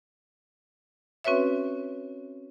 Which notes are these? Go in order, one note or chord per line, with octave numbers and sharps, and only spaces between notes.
C4 C#4 F#4 B4 C#5 E5